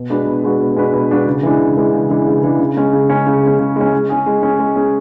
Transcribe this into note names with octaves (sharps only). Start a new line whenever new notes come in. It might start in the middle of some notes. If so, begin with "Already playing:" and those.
Already playing: B2
G#3 D4 F#4 B4
B2
G#3 D4 F#4 B4
B2
G#3 D4 F#4 B4
B2
G#3 D4 F#4 B4
C#3
E3 G#3 D4
C#3
E3 G#3 D4
C#3
E3 G#3 D4
C#3
E3 G#3 D4
C#3
G#3 C#4
C#3
G#3 C#4
C#3
G#3 C#4
C#3
G#3 C#4
G#3
C#4 G#4
G#3
C#4 G#4
G#3
C#4 G#4